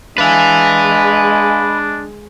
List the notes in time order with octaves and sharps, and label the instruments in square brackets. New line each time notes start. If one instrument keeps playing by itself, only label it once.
[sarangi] G#3 [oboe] D4 [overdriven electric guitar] B4 E5 [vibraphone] F5 G#5